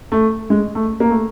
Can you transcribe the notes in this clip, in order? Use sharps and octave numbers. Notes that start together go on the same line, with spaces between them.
A3
G#3
A3
A#3
A3